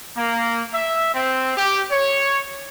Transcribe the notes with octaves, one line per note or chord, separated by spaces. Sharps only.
A#3
E5
C4
G4
C#5